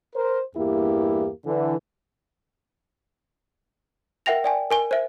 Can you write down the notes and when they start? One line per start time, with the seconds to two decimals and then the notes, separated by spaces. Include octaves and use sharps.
0.15 A#4 C5
0.56 E2 G2 A#3 E4 G4
1.46 D3 E3
4.26 A#4 E5 F#5 G5 A#6 F7
4.44 D5 G5 G#5
4.70 A#4 G#5 G7
4.91 C5 E5